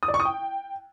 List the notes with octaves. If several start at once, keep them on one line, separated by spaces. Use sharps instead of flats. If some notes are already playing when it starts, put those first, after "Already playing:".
D#6
D5
C#6
D#6
G5